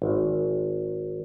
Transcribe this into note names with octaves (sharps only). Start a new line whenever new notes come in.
G#1